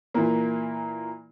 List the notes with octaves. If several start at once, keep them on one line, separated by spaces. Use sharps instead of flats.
A#2 E3 A#3